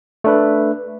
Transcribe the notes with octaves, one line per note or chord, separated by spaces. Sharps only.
A3 D4 B4